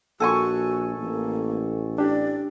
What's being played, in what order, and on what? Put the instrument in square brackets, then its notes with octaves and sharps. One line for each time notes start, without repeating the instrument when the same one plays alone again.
[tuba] A#1 [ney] F#4 [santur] A4 G#5 C#6
[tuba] A1 [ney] A#3
[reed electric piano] D4 G4 [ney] D5